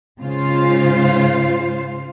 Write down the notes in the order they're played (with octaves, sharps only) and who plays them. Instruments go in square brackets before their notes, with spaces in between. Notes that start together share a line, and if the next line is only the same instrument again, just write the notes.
[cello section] G#2 C#3 F4 C5 F5